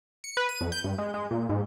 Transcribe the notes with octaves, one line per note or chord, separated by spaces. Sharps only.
C#7
B4
D#7
F2
G6
G2
G#3
G#3
A#2
G#2